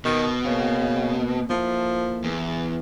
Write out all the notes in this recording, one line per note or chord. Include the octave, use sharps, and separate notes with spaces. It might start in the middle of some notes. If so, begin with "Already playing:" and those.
B2 D#3
C#3 A#3 C4
F3 A#3 E4 A4
E2